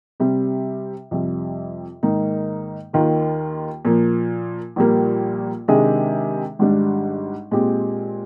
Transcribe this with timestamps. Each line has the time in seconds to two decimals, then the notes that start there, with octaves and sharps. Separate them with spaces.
0.20 C3 G3 C4
1.11 F2 C3 G3
2.03 G#2 D#3 A#3 D#4
2.93 D#2 D#3 A#3 F4
3.85 A#2 F3 A#3
4.76 A#1 A#2 G3 A#3
5.68 C3 D#3 G#3 D4 G#4
6.59 G#1 G#2 G3 D4
7.51 A#2 G#3 C4 G4